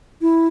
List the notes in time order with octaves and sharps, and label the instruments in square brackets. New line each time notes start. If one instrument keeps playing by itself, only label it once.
[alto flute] E4